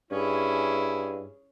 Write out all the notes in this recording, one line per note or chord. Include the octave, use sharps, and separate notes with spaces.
G2 C#4 E4 G#4